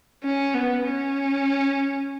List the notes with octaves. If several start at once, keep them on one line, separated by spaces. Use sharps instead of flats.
C#4
B3
C#4